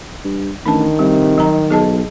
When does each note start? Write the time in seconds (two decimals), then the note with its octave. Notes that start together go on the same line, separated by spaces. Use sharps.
0.24 G2
0.66 A1 D#3 D4 A5
0.99 C3 G3
1.38 F#3 A#5
1.71 B1 G#4 D#5 A5